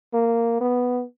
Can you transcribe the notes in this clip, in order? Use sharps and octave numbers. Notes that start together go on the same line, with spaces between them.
A#3
B3